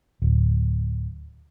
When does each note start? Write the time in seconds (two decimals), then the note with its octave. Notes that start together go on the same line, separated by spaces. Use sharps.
0.22 D1